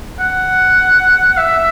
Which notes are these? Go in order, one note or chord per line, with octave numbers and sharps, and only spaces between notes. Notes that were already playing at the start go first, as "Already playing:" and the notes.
F#5
E5